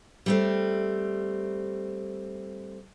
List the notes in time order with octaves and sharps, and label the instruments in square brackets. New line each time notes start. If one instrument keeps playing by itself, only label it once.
[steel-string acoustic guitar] G3 A3 C4